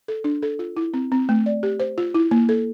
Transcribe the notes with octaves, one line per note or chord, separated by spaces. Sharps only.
A4
D4
A4
F4
E4
C4
C4
A3
D5
G4
C5
F4
E4
A#3
A4